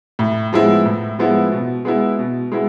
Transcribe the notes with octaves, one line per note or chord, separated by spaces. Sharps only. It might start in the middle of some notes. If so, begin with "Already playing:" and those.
A2
F3 G#3 B3 E4
A2
F3 G#3 B3 E4
B2
G#3 B3 E4
B2
G#3 B3 E4